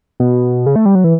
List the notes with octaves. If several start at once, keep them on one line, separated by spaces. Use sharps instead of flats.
B2
C#3
A3
G3
F#3
E3